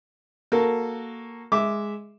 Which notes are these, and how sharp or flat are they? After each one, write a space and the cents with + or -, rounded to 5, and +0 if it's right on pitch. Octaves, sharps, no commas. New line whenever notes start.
A#3 +0 F#4 +0 A4 +0
G#3 +0 E5 -5 D6 +0